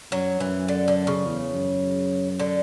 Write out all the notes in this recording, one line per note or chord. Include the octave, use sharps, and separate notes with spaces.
F#2 F#3
F#2 E3
D3
D3
C#3
E2
F#2
D3